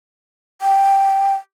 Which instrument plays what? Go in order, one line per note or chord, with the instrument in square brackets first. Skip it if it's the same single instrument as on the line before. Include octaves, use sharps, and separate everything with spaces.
[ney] G5